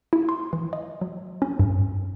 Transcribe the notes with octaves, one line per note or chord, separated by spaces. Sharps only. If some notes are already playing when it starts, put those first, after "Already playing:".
E4
C6
E3
D#5
F#3
C#4
G2